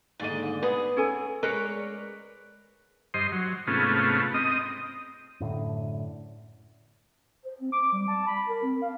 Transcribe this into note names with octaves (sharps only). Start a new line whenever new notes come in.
D#2 G#2 D3 D5 D#5
B3 G#4 D#6
C#4 A4 G#5
G#3 A#4 B4 C#5 D5
G2 C5 D#5 C6
F#3
G#2 C3 A3 B3 C#4 F4
C4 D#5 D#6
F#2 A2 D3
C5
C4
D6
G3
A5
B5
A#4
C4
F5